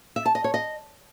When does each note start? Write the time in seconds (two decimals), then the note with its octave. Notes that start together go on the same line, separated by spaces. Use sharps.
0.16 E5
0.26 A5
0.35 D#5
0.44 C#5
0.54 D#5